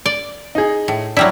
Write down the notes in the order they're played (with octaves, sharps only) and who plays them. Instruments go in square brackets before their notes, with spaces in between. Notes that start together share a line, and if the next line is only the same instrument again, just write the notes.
[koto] D5
[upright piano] D#4 G#4
[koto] A2
[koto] F#3 G3 E4 [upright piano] D4